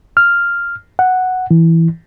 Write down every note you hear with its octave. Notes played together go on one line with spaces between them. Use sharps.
F6
F#5
E3